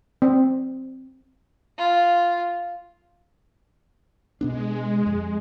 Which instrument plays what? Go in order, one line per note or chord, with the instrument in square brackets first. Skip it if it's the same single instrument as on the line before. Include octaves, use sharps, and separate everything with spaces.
[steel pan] C4
[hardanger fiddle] F4
[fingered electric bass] B2 B3 D4 [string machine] G#3
[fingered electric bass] F2